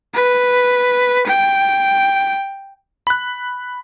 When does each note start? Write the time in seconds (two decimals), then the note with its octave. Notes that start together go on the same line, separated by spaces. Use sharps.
0.14 B4
1.27 G5
3.07 B5 F#6